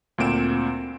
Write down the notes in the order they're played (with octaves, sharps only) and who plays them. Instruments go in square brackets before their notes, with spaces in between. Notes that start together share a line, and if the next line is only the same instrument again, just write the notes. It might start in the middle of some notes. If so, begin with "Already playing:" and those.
[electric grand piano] D2 A#2 C4 D7 E7